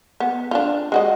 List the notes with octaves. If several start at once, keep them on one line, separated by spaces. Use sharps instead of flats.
B3
D4 F4
G#3 F#4 D#5